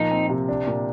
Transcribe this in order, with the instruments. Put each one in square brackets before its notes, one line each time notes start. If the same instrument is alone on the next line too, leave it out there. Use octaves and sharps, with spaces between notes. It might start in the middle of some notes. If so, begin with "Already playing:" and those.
Already playing: [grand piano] A#2 F3 [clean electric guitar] D#4
[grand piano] C4
C3
D4
A#2